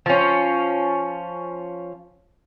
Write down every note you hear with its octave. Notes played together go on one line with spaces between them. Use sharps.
F3 C#4